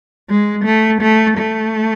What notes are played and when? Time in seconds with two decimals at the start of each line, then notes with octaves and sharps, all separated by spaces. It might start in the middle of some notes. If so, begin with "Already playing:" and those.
0.29 G#3
0.65 A3
1.02 A3
1.38 A3